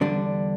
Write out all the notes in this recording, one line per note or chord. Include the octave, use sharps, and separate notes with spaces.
E2 D3 G3 D4